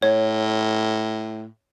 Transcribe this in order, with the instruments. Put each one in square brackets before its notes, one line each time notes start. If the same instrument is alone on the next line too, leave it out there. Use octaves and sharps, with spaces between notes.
[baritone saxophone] A2 [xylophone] C#5